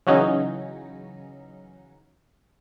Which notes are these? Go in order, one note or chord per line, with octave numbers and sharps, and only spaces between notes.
C#3 E3 F#3 C#4 D#4